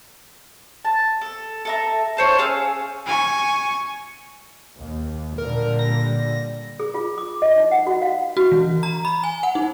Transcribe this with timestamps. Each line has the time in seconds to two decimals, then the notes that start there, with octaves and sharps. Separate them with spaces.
0.85 A5
1.21 A4
1.65 A4 E5 A#5
2.17 A4 C5 C#5
2.38 C#4 G#4 F5 E6
3.06 G#5 C#6
4.78 D#2
5.38 A#2 D3 G3 A#4
5.79 A#6
6.80 G#4
6.94 F4
7.18 D6
7.42 D#5
7.56 D#4
7.71 F#5
7.87 F#4
8.02 F5
8.37 F#4
8.52 E3
8.83 A#5
9.05 B5
9.23 G#5
9.43 F#5
9.55 D#4